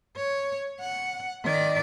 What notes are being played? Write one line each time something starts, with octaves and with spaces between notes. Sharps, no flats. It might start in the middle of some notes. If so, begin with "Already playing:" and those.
C#5
F#5
D#3 D5